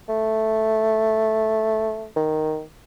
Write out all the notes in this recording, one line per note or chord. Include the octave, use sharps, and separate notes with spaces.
A3
D#3